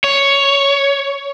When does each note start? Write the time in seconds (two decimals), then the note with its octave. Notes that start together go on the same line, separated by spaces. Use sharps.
0.04 C#5